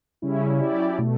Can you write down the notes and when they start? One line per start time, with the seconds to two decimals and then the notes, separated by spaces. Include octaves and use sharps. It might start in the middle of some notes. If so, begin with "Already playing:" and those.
0.22 C#3 G3 C#4 E4
0.60 F#3 C#4 E4 G4 D5
0.98 B2 A3